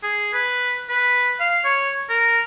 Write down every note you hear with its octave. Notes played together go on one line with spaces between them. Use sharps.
G#4
B4
B4
F5
C#5
A#4